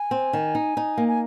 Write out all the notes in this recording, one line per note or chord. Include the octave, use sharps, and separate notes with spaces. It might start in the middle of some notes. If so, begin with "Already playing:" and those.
Already playing: G#5
C4
D#3
D#4
D#4
A#3
G#5